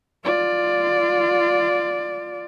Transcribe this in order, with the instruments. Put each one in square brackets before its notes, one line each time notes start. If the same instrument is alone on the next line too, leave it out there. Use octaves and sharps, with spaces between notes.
[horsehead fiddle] F4 D5